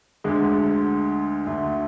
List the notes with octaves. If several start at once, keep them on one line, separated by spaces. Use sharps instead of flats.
D2 D3 G#3
D2 D3 A3